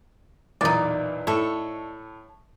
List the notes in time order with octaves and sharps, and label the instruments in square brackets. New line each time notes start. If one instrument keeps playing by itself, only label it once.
[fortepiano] B1 E2 A#2 [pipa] D#4 D5
[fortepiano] A2 [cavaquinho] A4 C#5